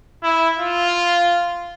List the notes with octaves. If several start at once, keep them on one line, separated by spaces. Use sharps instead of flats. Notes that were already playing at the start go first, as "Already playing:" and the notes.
E4
F4